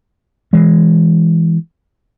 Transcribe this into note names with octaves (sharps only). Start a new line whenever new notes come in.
E3 G#3